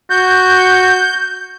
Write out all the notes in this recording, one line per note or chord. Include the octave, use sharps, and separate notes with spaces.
F#4 G6